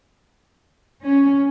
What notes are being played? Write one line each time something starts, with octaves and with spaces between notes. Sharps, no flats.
C#4